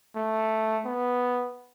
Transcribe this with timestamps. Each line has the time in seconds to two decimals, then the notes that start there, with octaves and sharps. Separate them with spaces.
0.16 A3
0.85 B3